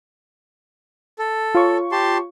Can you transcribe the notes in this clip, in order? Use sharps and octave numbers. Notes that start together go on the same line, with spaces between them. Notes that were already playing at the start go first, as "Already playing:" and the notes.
A4
F4 C#5 C#6
G4 A5 C6